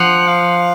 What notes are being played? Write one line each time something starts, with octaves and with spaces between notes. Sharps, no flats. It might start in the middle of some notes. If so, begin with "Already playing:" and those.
Already playing: F3 F#5
F5